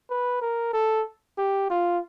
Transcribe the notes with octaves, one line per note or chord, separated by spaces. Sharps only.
B4
A#4
A4
G4
F4